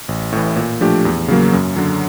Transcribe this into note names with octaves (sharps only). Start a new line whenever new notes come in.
A1
A2 E3
A#2
F3 A3 D4 G4
E2
C#3 F#3 A#3
F#2
D3 F#3